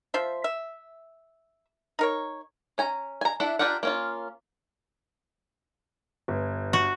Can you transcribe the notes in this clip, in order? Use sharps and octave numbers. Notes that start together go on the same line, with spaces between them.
F3 C5 E5
E5
D#4 A#4 C#5
C#4 G#5 A#5
G#5 A#5
D4 E4 A4 E5 F#5
D4 F4 G4 A#4 F#5
A#3 C#4 F4
G1 B4
F#4